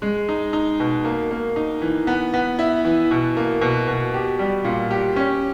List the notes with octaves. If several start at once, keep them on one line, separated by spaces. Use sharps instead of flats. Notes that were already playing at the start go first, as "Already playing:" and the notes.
G#3
D#4
D#4
B2
A#3
A#3
D#4
E3
B3
B3
E4
E3
B2
A#3
B2
B2
G4
G3
A#2
G4
C#4